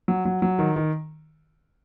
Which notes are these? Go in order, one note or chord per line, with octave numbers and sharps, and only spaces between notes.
F#3
F#3
F#3
D#3
D#3